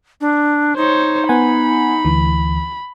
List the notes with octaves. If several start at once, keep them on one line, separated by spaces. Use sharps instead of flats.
D4
D#4 C5 C#5
B3 F#5 G#5 B5
D2 E3